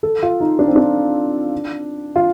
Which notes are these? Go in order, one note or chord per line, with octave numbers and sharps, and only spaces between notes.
A4
F4
D#4
D4
C4
D4
F4